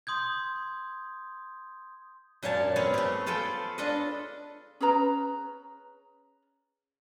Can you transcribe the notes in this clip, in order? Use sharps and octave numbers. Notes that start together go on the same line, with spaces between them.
C6 D#6 G6 G#6
F#2 A#2 C#4 C#5 A5
B3 C4 G#4 C#5 F5
A3 G4
F4 G#4 A4 B4 G5
D4 F4 A4 B4 D#5
C#4 G#4 B4 A#5